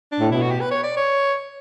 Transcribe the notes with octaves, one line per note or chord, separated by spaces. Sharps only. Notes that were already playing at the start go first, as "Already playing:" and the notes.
D4
A2
B2 E4
F#4
G4
B4
C#5
D5
C#5